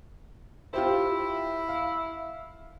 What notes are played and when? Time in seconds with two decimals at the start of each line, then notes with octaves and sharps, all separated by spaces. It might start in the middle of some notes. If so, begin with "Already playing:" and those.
0.74 E4 F4 G4 C5
1.69 F5